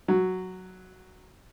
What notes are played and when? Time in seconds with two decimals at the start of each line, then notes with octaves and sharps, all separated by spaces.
0.08 F#3